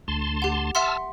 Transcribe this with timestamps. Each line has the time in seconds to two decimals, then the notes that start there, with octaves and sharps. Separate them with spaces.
0.08 D2 A5 C6
0.42 G4 F#5
0.75 E5 F#5 A5 C6 E6 F6